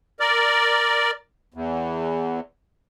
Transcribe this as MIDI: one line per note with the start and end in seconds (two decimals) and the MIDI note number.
0.20 1.11 70
0.20 1.11 74
1.54 2.40 40